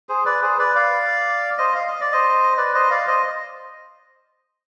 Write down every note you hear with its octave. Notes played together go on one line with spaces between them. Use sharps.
G#4 C5
B4 D5
G#4 C5
B4 D5
D5 F5
C5 D#5
F5
D#5
D5
C5 D#5
B4 D5
C5 D#5
D5 F5
C5 D#5